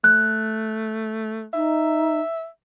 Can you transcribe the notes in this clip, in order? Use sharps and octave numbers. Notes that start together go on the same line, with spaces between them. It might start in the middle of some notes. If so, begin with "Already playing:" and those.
A3 F#6
D#4 E5